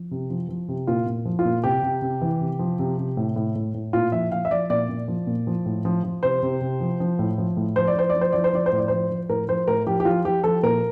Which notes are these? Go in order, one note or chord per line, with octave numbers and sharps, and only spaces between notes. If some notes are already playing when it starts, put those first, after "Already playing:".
Already playing: F3
C3
F3
F3
C3
A#2 F4
A#2
F3
F4
A#2
C3 G4
C3
C3
E3
C3
F3
C3
C3
A2
A2
A2
A2
A#2 F4
F3 E5
F3 F5
E5
F3 D5
A#2 D5
A#2
F3
A#2
F3
A2
F3
F3
C3 C5
C3
C3
F3
F3
A2
F3
A2
F3 C5
D5
F3 C5
F3 D5
C5
F3 D5
C5
F3 D5
C5
A2
D5
F3 C5
F3
A2 A#4
F3 C5
A2 A#4
F3 G4
G4
F3 F4
F3 G4
F3 A4
A#2 A#4